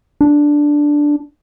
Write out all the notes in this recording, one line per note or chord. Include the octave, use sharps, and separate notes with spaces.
D4